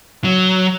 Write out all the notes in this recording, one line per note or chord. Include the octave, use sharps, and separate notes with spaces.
F#3